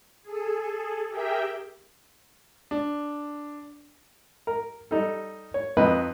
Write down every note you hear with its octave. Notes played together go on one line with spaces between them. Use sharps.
G#4 A4
G4 G#4 A#4 E5 G5
D4
A#4
G3 D#4 A4
C#5
F2 D#4 G4 B4 D#5